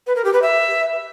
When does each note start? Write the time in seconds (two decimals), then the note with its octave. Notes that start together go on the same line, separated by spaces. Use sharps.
0.07 B4
0.16 A#4
0.25 G4
0.33 B4
0.42 E5